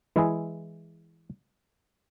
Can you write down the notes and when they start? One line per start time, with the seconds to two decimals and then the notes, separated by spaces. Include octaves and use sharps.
0.16 E3 G#3 E4 G#4